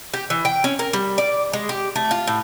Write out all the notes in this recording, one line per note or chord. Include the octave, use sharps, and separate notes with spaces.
G4
E3
G5
C#4
A#4
G3
D5
G#3
G4
A3
F4
A2